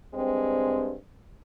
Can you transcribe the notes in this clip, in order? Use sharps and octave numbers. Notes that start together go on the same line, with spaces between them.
G2 G#3 C4